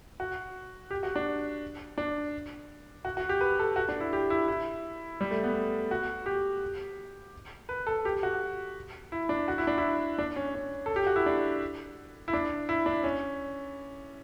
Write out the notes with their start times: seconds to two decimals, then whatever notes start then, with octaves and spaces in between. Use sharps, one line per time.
0.20 F#4
0.91 G4
1.03 F#4
1.16 D4
1.98 D4
3.05 F#4
3.17 F#4
3.29 G4
3.41 B4
3.59 A4
3.76 F#4
3.89 D4
4.00 E4
4.13 G4
4.30 E4
4.48 E4
5.21 G3
5.31 A3
5.44 B3
5.91 F#4
6.26 G4
7.69 B4
7.87 A4
8.05 G4
8.23 F#4
9.12 E4
9.29 D4
9.48 F#4
9.58 E4
9.67 D4
9.78 E4
10.19 D4
10.36 C#4
10.55 C#4
10.86 A4
10.96 G4
11.07 F#4
11.16 E4
11.26 D4
12.28 E4
12.33 D4
12.69 E4
12.86 D4
13.04 C#4